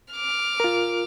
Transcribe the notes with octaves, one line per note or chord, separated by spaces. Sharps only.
D6 F6
F4 A#4